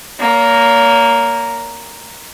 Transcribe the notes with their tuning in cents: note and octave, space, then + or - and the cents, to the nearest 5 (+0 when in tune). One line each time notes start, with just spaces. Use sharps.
A#3 +0 C#5 +45